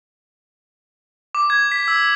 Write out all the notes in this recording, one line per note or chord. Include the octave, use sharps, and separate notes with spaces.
D6
G#6
B6
E6